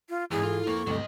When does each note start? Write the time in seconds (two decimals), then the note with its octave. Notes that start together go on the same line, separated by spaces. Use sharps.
0.09 F4
0.31 E2 G#2 E3 G#4
0.43 F4 A4
0.67 F2 A#3 C#6
0.87 D2 G2 C3 F#3 D#5